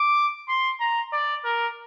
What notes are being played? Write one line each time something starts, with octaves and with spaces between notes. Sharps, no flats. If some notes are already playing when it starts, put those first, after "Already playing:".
Already playing: D6
C6
A#5
D5
A#4